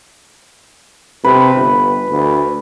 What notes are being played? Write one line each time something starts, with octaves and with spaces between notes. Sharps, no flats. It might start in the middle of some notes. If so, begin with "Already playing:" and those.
C3 B4
G1
D2